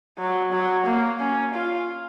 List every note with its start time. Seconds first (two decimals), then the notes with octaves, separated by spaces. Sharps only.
0.18 F#3
0.53 F#3
0.86 A#3
1.20 C#4
1.54 F4